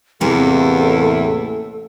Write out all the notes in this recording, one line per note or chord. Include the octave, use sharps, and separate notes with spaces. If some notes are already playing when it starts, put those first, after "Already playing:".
A1 E2 C3 A#3 A4